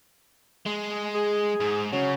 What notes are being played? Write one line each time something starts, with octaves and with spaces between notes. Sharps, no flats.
G#3
G#4
G#2
C#3 F#3